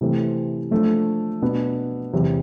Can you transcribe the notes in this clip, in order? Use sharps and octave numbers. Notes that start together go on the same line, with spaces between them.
C3 E3 A3 C4
F3 A3 D4
B2 B3 D4
E2 C3 G#3